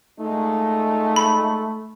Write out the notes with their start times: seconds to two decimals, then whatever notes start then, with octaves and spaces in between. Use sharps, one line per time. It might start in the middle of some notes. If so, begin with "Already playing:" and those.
0.19 A#2 G#3 A3 D#4
1.16 B5